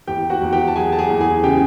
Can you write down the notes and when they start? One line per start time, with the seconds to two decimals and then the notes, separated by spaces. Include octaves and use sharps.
0.07 E2 G4 G5
0.30 F#4 F#5
0.42 E2
0.53 G4 G5
0.68 A5
0.76 F#3 G#4 G#5
0.92 A5
0.98 G#4 G#5
1.10 E2
1.21 G#4 G#5
1.44 C#3 G4 G5